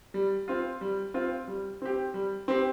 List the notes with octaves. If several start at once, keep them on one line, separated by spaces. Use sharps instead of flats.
G3
C4 F4
G3
C4 F4
G3
C4 G4
G3
C4 G4